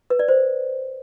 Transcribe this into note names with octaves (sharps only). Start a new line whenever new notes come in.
B4
D5
C5